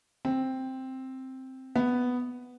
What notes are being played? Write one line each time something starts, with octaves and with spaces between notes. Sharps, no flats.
C4
B3